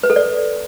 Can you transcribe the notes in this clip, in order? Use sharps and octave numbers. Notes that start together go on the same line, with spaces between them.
B4
A4
D5